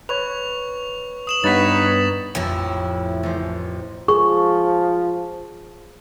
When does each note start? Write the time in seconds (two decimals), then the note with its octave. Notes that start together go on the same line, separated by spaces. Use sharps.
0.09 B4 C#5 C#6 F7
1.27 D#6 E7 F#7
1.44 G2 B3 D#4 B4 C#5 A6 B6
2.35 A1 F2 A2 E4
3.23 A1 C5
4.08 F3 G#4 C#6